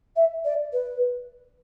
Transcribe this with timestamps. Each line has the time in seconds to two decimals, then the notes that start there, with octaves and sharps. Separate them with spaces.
0.16 E5
0.45 D5
0.73 B4